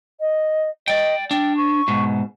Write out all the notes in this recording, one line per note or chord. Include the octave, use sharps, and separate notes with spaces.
D#5
D5 D#5 G5
D4 G5
C#6
G#2 B2